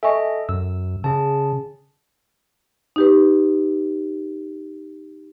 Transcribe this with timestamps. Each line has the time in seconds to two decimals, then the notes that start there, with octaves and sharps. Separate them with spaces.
0.03 A4 D#5 E5 G#5 C#6
0.49 F#2 E6
1.04 C#3 G#4 A5
2.96 D#4 G4 B4